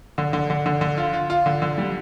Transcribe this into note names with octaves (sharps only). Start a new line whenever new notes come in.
D3
D3
D3
D3
D3
F4
F4
F4
D3
D3
G3